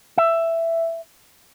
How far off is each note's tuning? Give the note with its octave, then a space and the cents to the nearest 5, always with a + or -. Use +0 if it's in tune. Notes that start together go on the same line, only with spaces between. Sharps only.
E5 +10